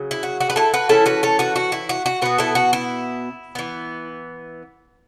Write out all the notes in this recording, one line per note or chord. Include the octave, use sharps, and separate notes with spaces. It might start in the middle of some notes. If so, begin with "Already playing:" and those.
Already playing: C#3 F#3
E4
F#4
F#4
B4
E4 A4
F#4 B4
E3 C#4 E4 A4
F#4 B4
A4 C#5
F#4 B4
F#4
E4
F#4
F#4
B2 B3 F#4 B4
E4 A4
F#4
E4
E3 B3